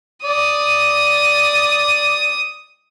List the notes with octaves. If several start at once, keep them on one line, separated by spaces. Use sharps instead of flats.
D5 D#6